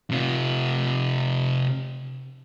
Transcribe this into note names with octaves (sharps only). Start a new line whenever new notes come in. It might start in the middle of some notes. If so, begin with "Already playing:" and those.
C3 F4